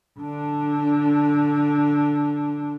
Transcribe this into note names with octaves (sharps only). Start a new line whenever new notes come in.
D3 D4